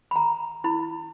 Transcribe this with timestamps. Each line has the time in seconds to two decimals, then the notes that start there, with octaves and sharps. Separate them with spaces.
0.11 A#5 B5
0.64 E4 B5